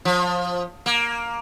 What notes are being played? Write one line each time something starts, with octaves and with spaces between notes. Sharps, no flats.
F3
A#3